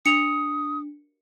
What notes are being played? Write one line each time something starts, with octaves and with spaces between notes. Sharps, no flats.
D4 D#6 C#7 F7